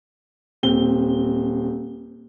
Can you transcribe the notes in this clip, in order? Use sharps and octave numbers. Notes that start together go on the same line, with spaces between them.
D#1 C4 G7